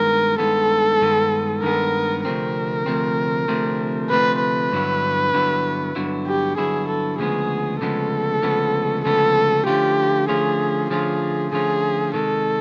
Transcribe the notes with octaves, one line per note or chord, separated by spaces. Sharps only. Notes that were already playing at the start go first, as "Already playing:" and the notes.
Already playing: G2 D#3 G#3 B3 A#4
G2 D#3 G#3 B3 A4
G2 D#3 G#3 B3
G2 D#3 G#3 B3 A#4
D2 C3 F3 A3 C4 A#4
D2 C3 F3 A3 C4
D2 C3 F3 A3 C4
D2 C3 F3 A3 C4 B4
B4
G2 D3 F#3 B3 E4
G2 D3 F#3 B3 E4
G2 D3 F#3 B3 E4
G4
G2 D3 F#3 B3 E4 G#4
A4
D2 C#3 F3 G#3 B3 G#4
D2 C#3 F3 G#3 B3 A4
D2 C#3 F3 G#3 B3
D2 C#3 F3 G#3 B3 A4
D3 F3 A3 C#4 F4 G4
D3 F3 A3 C#4 F4 G#4
D3 F3 A3 C#4 F4 G#4
D3 F3 A3 C#4 F4 G#4
C3 D#3 G#3 A4